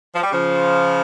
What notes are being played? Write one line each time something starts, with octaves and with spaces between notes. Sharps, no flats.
F3
G3
C#3 F3